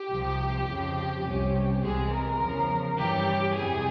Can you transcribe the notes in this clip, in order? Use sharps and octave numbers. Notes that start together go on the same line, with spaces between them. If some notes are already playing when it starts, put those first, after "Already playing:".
Already playing: G4
C2 C3 F3
F2 C#3 F3
C2 C3 G3 C#4
C2 C3 E3 G#3 G#4
A#4
E2 C#3 F3
G2 E3 G3 C#4 G4
F2 C3 G3 G#4